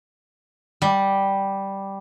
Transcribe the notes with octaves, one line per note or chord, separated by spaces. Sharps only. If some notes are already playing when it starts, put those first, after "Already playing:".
G3